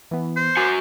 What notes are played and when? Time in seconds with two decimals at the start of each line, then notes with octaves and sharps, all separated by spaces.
0.11 E3 B3
0.37 C5
0.57 F#4 A#4 G#5 D6 A#6